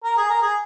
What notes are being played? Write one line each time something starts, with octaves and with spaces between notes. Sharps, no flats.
A#4
G#4
A#4
G#4